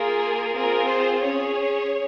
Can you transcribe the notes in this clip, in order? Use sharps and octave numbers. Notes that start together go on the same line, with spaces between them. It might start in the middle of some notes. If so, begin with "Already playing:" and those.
Already playing: A#3 F4 G#4 A#4
C4 F4 G#4 A#4
C5
C#4 G#4 C#5